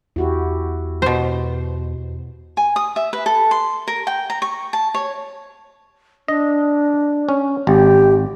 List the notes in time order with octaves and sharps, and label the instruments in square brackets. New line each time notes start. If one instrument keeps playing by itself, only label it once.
[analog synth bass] E2 [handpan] E4 F#4 G4
[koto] B2 C5
[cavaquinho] G#5
D#6
E5
B4
A4
C6
A#4
G5
A#5
C#6
A5
C#5
[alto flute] D4 [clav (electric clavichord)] D#5
[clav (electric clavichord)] C#4
[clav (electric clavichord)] G#1 [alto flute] G4